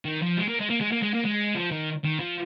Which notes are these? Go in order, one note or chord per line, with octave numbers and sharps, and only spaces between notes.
D#3
F3
G#3
A#3
G#3
A#3
G#3
A#3
G#3
A#3
G#3
F3
D#3
D#3
F3